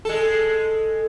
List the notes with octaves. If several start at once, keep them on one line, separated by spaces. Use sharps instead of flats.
G#3 A4